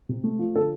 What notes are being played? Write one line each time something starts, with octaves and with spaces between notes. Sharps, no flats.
C3
A3
F3
D3 A4